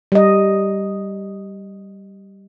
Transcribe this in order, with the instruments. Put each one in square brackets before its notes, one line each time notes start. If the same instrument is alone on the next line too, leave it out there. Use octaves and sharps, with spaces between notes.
[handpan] G3 D#5